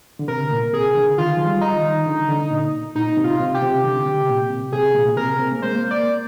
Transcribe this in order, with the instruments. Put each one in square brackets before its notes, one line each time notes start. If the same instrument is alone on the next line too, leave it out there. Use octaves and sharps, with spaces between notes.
[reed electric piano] D3
[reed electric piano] C3 [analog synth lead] A#4
[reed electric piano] A#2
[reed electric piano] C3 [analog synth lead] G#4
[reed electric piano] D3
[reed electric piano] D#3 [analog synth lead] F4
[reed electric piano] F3
G3
[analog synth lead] D#4
[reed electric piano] D#3
D3
D3
A#2
[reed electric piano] A#2 [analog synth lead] D#4
[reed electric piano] C3
[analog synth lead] F4
[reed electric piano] C3
[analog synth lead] G4
[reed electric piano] C3
D3
C3
A#2
C3
[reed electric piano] C3 [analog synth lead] G#4
[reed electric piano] A#2
A#2
[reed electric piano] C3 [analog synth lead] A#4
[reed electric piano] C4
A#3
[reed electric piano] G#3 [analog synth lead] C5
[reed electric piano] A#3
[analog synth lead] D5